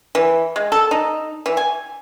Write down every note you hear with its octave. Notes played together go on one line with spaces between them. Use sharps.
E3
G#3
A4
D#4
E3
G#5